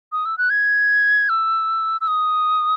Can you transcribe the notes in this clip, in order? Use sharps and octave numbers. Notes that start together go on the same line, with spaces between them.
D#6
E6
F#6
G#6
E6
E6
D#6